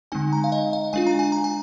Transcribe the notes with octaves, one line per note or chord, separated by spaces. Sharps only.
D3 G#3 C4 D#4 G#5
A#5
F5
D#5
F5
G#3 D4 F4 G#5
A#5
G#5
A#5
G#5